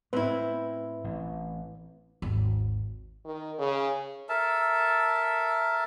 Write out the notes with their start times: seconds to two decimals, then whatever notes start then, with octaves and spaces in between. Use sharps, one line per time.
0.13 A2 C4 E4 B4
1.04 A1
2.22 G#1 D#2
3.25 D#3
3.59 C#3
4.29 A4 A#4 E5 A5